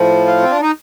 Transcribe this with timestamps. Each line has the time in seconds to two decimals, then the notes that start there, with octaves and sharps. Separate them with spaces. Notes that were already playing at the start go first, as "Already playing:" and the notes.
Already playing: A2 F3
0.27 F4
0.42 C4
0.51 D4
0.62 D#4